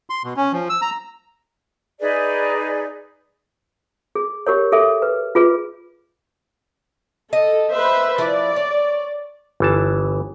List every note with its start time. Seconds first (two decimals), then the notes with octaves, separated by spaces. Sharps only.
0.10 C6
0.24 B2
0.37 C#4
0.52 F3
0.69 E6
0.82 A#5
2.00 D#4 G#4 B4 D5
4.15 G#4
4.47 G4 A#4 C#5
4.72 G#4 A4 E5
5.02 B4
5.35 F4 G#4 B4
7.33 A4 D#5
7.71 B4 C5 E5
8.18 F3 E4 D5
8.56 C#5
9.60 G1 E3 A5